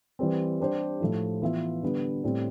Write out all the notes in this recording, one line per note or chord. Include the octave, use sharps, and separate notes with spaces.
E3 G3 C4
G3 D4 G4 C5
A2 F3 A3 E4
E3 B3 F4 B4 E5
D3 G3 B3
A2 G3 C4 E4